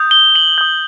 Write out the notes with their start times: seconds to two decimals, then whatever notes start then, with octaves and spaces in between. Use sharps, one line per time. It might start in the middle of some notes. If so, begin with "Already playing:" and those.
Already playing: D#6 G6
0.11 G7
0.36 F#7
0.58 D#6 G6